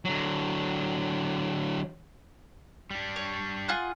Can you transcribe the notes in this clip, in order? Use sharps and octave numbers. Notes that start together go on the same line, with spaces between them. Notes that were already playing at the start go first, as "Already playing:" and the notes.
D3 F#3
G3 D4
C#5
F4 G#4 F#5